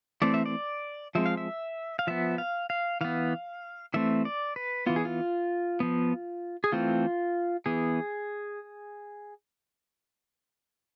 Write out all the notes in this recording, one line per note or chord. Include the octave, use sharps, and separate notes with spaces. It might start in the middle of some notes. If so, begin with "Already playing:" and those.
E3 A3 C4 D5
E5
D5
F3 G#3 C4 E5
F5
E5
F5
F3 B3 E5
F5
F5
E3 B3 F5
E3 A3 C4 E5
D5
B4
E3 B3 F4
G#4
F4
F3 B3
G#4
E3 A3 C4 F4
E3 B3 G#4